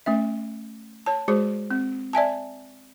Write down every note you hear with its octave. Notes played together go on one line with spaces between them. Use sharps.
A3 C#4 E5
C#5 A5
G#3 F#4 G#4 C5
C4
D5 E5 G#5 A5